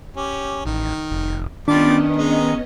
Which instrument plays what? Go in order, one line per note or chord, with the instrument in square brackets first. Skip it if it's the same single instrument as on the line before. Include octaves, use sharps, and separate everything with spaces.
[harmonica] C#4 G4
[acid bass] A1 [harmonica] D#3
[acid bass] F1
[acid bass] D#3 [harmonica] G3 F4 D6 [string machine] B3 C#4 D#5 [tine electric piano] D4
[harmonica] G#3 D#4